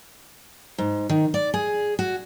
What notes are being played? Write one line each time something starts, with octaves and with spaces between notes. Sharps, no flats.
G#2
D#3
D5
G#4
F#4